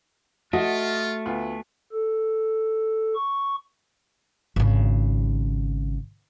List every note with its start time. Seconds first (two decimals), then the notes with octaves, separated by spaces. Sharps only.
0.53 A3 F4 F#4 D#5
1.26 D2 B3 F4
1.92 A4
3.15 C#6
4.56 G#1 C#3